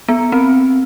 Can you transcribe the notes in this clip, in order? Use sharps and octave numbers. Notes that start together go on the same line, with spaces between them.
B3
C4